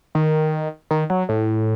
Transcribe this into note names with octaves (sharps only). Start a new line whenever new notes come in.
D#3
D#3
F#3
A2